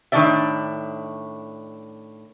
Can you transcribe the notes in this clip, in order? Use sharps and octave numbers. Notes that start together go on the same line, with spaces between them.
A2 D#3 G3 D4 D5 E5